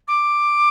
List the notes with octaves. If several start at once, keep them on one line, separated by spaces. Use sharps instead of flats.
D6